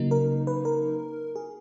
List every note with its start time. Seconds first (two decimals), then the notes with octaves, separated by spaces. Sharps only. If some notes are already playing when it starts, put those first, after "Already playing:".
Already playing: C#3 F#3 A#3 D#4
0.11 A#4
0.47 B4
0.65 A#4
1.36 G#4